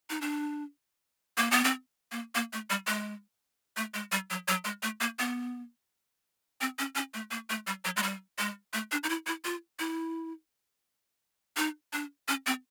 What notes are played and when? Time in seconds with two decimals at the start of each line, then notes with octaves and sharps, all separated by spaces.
0.10 D#4
0.21 D4
1.37 A#3
1.51 B3
1.64 C4
2.12 A#3
2.35 A#3
2.53 A3
2.70 G3
2.87 G#3
3.76 A3
3.94 G#3
4.12 G3
4.30 F#3
4.48 F#3
4.65 G#3
4.83 A3
5.01 A#3
5.19 B3
6.61 C4
6.79 C#4
6.95 C#4
7.14 A3
7.31 A#3
7.50 A3
7.67 G3
7.85 F#3
7.96 G#3
8.03 G3
8.38 G#3
8.73 A3
8.92 D4
9.03 D#4
9.09 E4
9.27 E4
9.45 F4
9.79 E4
11.57 D#4
11.93 D4
12.28 C#4
12.46 C4